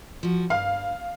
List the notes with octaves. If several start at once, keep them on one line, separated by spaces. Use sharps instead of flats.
F3 F#4
G2 F5